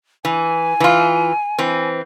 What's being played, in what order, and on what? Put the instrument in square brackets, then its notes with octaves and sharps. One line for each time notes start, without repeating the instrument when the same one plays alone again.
[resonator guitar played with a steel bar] E3 [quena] G#5
[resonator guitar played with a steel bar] E3 F4
E3 C4